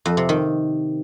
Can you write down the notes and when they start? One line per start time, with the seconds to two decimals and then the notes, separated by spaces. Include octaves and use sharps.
0.05 F2
0.17 C3
0.29 D#3